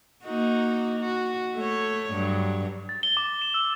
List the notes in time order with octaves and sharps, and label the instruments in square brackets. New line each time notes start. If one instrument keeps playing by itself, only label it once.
[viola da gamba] A#3 D#4 F#4
F#4
A3 C#5
G2 F#3
[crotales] A6
G7
D6
E7
E6